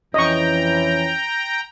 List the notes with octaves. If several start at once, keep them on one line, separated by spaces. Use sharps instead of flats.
F2 E3 C#4 D#5 G5 A#5 C#6